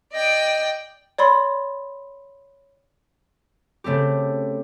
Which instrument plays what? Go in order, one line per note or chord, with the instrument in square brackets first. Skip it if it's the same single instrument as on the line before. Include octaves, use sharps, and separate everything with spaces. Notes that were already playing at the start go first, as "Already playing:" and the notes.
[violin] D5 G5 [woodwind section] D#5
[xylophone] C#5 D5 B5 C6
[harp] C#3 A3 C4 G4